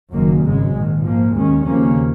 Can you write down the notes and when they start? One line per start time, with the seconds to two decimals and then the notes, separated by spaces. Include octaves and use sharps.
0.12 F#1 F#2 D#3 A#3
0.43 G#1 F#2 C#3 G#3
0.73 A#1 G#2 D#3
1.04 G#2 F3 A#3
1.35 D#2 D#3 G#3 C#4
1.66 D#2 C#3 F3 A#3 C#4